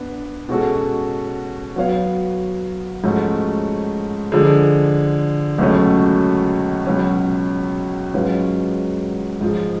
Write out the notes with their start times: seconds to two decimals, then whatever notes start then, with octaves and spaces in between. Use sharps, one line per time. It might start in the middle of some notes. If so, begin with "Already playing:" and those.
Already playing: B3 D4
0.49 B2 G#3 C#4 F#4 A4
1.76 F#3 B3 F#4 C#5 F5
3.04 G#2 F3 A3 C#4 F#4
4.32 D3 F3 G#3
5.58 C#2 B2 F#3 A3 C#4
6.86 C#2 B2 F#3 C#4
8.14 G#2 F#3 C#4 F4 B4
9.41 G#2 F3 G#3